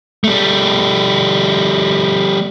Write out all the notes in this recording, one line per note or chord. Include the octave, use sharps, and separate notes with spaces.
G3 A3